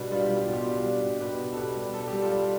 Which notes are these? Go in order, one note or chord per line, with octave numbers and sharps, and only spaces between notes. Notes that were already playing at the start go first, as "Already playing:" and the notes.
Already playing: B2 G3 B3 D4
G3 F4
G4
G3 F4
G4
F4
B2 G4
F4
G3 G4
D4 F4
G3
B2
B2 G4 B4
B2
A4
B2 G4 B4
G3
G3 A4
G3 G4
F4 A4
G3